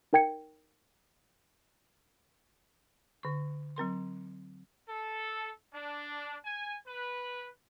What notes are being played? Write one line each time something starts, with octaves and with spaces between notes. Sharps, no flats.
D#4 A#4 G5 G#6 C#7
D3 C#6
F#3 C4 A#4 C6
A4
D4
G#5
B4